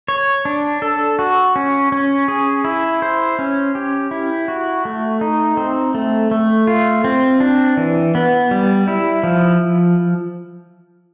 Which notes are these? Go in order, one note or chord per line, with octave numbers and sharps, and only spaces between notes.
C#5
D4
A4
F#4
C#4
C#4
G#4
E4
C5
C#4
G4
E4
F#4
A3
D#4
C4
A3
A3
F4
C4
D4
E3
B3
G3
E4
F3